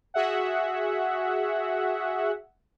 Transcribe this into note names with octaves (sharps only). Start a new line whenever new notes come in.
F#4 G#4 E5 F#5